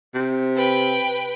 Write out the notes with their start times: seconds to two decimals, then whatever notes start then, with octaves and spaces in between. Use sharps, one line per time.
0.14 C3
0.56 B4 G5